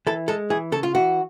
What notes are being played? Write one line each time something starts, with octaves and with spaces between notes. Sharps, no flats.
E3 A4
G#3 A4
E3 G#4
C#3 A4
F4
E3 F#4